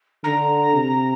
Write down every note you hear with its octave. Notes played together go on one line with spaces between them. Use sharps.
D3 A#5
C3